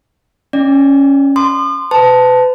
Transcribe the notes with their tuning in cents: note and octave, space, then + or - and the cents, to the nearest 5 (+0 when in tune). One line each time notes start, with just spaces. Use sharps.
C#4 +0 D5 +15
C6 -15 D#6 -40
B4 +35 A5 +0